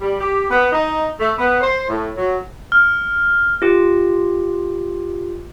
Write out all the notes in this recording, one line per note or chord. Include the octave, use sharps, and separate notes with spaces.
G3
G4
B3
D#4
A3
B3
C5
A2
F#3
F6
F4 G4